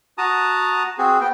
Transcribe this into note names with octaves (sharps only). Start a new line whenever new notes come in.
F#4 A5 A#5 D#6
C4 F#4 G#4
B3 G5